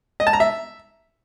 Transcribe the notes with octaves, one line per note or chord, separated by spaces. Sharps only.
D#5
A5
A#5
E5